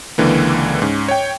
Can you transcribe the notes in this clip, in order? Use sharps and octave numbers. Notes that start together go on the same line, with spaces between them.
C#2 D3 E3 A#3
G#2 C#4
C#5 G5